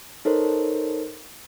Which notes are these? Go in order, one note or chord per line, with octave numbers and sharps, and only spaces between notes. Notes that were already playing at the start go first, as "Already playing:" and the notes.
D#4 A4 A#4 C5 C#5